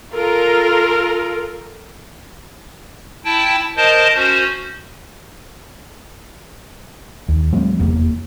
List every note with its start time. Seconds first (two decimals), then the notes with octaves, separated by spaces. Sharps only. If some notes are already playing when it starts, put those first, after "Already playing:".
0.13 F4 A4 A#4
3.25 E4 G5 A5
3.76 A#4 C5 D#5 A5
4.15 C#4 F#4 C5
7.28 D#2
7.53 F3 G3 A3 C4
7.79 F1 E2 A#3